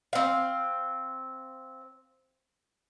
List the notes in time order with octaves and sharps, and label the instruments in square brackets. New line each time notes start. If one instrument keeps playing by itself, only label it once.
[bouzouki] C4 F5